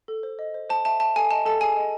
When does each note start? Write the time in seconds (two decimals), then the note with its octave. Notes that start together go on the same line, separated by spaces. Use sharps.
0.08 A4
0.23 C5
0.39 D#5
0.54 C5
0.70 C5 A5
0.85 E5 A5
1.00 E5 A5
1.16 A4 G#5
1.31 D#5 A5
1.45 A4 A5
1.61 G#4 G#5
1.77 D#5